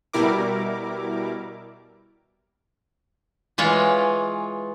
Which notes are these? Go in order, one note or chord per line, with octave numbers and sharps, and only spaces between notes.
B2 G3 E4 A#4 D6
E3 G#3 F4 C#5